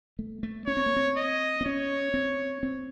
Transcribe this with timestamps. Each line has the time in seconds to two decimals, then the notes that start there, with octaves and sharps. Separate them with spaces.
0.19 A3
0.43 A3
0.67 C#4 C#5
0.77 C4
0.86 A#3
0.96 C4
1.17 D#5
1.61 C4
1.65 C#4 C#5
2.14 C4
2.63 C4